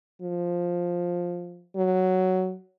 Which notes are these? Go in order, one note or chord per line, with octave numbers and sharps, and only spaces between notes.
F3
F#3